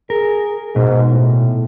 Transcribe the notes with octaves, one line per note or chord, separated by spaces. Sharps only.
G#4 A#4
G#2 B2
A2